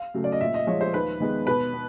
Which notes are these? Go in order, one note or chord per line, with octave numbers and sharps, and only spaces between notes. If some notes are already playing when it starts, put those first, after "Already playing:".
Already playing: F5
C#3 F#3 A3
D5
D#5
A#2 E5
D#5
F3 G#3 C#5
C5
D#2 B4
D#3 G#3 B3
B2 B4
B3